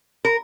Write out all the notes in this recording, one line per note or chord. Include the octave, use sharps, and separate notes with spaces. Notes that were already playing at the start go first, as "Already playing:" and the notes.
A#4